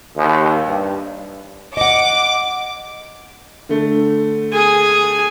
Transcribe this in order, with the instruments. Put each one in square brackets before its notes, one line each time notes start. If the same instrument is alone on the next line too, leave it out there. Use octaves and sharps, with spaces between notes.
[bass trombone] D#2
G2
[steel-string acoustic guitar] D#5 F#5 [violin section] D6
[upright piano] D3 A3
[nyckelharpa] G#4 G#5